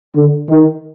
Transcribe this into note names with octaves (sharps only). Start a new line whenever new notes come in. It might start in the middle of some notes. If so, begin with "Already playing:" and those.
D3
D#3